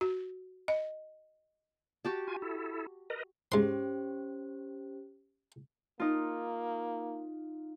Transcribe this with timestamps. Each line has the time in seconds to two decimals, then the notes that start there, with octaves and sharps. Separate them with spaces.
0.01 F#4
0.68 D#5
2.05 F#4 G4 A5
2.28 F4 G#5
2.42 E4 A4
3.10 A#4 B4 D#5
3.52 G#2 C#4 G4 C5 C6
6.00 A#3 D#4 F4